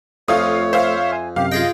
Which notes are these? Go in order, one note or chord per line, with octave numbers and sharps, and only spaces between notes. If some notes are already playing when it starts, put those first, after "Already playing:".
F2 A3 F4 C#5 F5 D#6
C5 E5 F5
G#5
F#2 C3 G4 F5
F4 G#4 D#5 G5